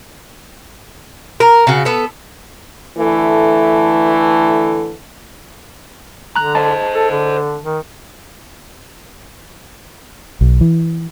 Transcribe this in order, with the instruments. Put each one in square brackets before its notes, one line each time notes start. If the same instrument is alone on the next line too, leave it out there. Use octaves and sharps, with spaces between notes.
[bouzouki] A#4
C#3 F#4
B3 A4
[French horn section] D3 E3 A3 A4
[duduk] D3 [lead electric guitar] A#5 [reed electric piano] F#6
[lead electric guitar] C5 D#5 [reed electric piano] A5
[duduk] A4
D3
D#3
[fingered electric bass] B1
E3